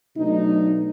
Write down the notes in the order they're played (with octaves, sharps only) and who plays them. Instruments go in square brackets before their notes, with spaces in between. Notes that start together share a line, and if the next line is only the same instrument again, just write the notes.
[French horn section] B2 F#3 A3 D4 D#4